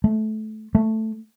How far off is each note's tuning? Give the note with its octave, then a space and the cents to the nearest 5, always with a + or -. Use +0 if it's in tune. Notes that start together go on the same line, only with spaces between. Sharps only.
A3 -20
A3 +5